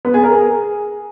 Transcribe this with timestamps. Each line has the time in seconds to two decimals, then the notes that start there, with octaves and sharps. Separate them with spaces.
0.05 B3
0.14 G#4
0.23 A#4
0.33 G#4